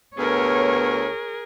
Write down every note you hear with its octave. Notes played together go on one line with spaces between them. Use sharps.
D2 B3 G#4 A#4 C#5